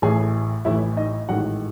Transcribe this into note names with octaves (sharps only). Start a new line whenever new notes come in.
A1 A2 E3 G#4 G#5
A1 A2 E3 E4 E5
D#4 D#5
A1 G#2 D#3 F#4 F#5